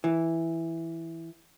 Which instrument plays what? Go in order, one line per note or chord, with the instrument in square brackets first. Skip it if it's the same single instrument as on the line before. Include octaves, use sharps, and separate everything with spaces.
[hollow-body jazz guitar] E3